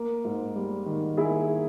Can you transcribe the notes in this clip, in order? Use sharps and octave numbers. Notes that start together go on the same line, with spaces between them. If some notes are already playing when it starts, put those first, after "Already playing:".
Already playing: A#3
G#2
G3
D#3
A#3 E4 G#4